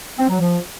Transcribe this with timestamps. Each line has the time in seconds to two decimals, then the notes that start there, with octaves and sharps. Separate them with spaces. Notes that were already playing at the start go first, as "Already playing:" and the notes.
0.18 C4
0.29 F#3
0.39 F3